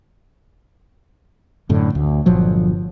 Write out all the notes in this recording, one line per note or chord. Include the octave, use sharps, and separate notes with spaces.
F#2 A2 D3
D2
G1 A#2 F3 F#3